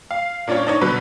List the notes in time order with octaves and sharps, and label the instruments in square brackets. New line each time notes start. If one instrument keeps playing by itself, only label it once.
[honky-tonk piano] F5
A#2 C#4 D4 F4 C#5
D4 D#4 C#5
B2 D3 F#3 B4 F#6